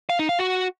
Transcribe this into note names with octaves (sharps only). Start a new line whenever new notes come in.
F5
D#4
F5
F#4